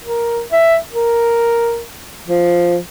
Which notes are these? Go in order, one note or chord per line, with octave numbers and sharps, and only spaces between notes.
A#4
E5
A#4
F3